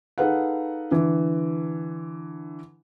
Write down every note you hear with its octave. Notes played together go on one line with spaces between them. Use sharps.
D#4 G#4 A4 B4 F5 F#5
D3 E3